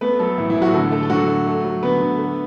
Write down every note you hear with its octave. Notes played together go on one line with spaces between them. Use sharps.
A3 B3 B4
F#3 A3 A4
A2 E3 E4
E3 E4
A2
F#3 F#4
D3 A3 A4
A3 A4
A4
D3 F#3 F#4
A3
A3
F#3
D3 B3 B4
D3
A3